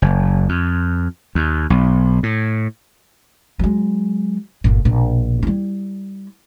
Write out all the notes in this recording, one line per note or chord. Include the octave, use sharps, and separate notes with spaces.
F#1
F2
D#2
B1
A2
F#3 G#3
G1 A#2
A#1 B2
G3 E4